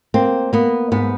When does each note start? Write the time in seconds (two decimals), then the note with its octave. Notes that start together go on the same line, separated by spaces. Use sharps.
0.14 A#3 C4
0.53 A#3 B3
0.92 G#2 B3